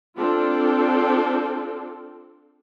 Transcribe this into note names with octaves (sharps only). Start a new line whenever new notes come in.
C4 D4 F4 A4